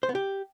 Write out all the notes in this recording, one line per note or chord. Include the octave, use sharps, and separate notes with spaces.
C5
B3
G4